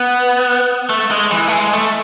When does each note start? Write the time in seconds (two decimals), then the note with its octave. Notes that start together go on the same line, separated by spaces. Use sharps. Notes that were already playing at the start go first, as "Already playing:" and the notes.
Already playing: B3
0.90 A3
1.11 G#3
1.31 E3
1.48 A3
1.52 G#3
1.73 A3